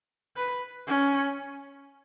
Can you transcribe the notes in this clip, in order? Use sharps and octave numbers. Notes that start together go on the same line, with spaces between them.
B4
C#4